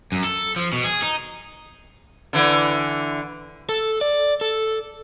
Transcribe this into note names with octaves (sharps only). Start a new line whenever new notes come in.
F#2
A4
F3
B2
G#4
D#4
D3 E3
A4
D5
A4